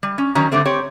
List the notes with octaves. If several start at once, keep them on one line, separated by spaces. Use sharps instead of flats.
G3
C#4
D#3 F#3 C#4 C#5 A#5
G2 D3 G3 A3 C4
C4 G4 C#5